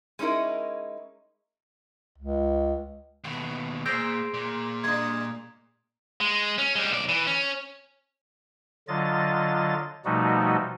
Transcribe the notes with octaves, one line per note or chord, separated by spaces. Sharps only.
G#3 C#4 D#4 E4 A#4
C#2
D#2 B2 G#3
A#2 G#4 C5 E6 G6 A#6 C7 D7
A#2
G3 D4 D#6 G#6
G#3
C#4
G3 G#3
B1 D5
E3
C#4
D3 F#3 F4 D#5 A6
B2 F3 G3 A3 D#4 F#4